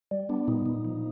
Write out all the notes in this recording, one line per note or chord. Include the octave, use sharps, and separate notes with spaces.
G3
B3 D4
A#2 D#4
A#2
F3